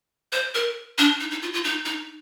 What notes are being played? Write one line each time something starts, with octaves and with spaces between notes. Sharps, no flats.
C5
A#4
D4
D#4
D#4
F4
F4
D#4
D#4